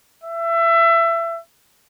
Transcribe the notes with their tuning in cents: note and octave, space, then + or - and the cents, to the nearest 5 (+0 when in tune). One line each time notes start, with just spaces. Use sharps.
E5 +25